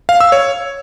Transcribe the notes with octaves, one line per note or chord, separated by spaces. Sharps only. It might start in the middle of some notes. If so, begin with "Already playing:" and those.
F5
E6
C#5